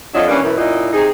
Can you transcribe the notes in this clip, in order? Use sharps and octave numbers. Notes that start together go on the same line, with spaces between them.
F2 F#3 D4 F4 D#5
E3 G3 A#3 C#4 D4
F#2 B2 E3
F#2 A#2 D#4 E4 D#5
C3 D#4 G#4